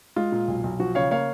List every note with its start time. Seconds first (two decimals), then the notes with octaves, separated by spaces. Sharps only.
0.16 G#3 F4
0.32 A#2
0.48 B1
0.64 B1
0.80 F3 F#4
0.95 C#3 C#5 F5
1.11 A#3 C#5 F5